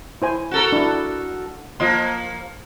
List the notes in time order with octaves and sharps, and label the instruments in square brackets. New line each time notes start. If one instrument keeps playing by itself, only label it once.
[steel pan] E4 C5 G#5
[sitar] F#4 A4 A#4
[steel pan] D4 E4
[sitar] F3 A#3 [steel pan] F4 D#5 C6